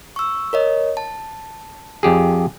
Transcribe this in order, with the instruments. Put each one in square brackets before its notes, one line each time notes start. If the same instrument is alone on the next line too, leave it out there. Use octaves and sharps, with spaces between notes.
[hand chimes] C#6 E6
A#4 C#5 D#5
A5
[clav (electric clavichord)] F2 G4 G#4